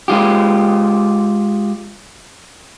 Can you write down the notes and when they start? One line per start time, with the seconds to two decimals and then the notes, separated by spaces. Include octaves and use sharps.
0.08 G#3 F4 G4